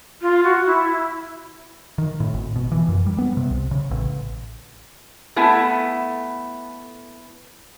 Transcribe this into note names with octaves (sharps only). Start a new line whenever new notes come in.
F4
F#4
E4
D#3
A2
G#1
B2
E3
F#2
G3
B3
C3
C2
C#3
A1
A3 B3 E4 G#5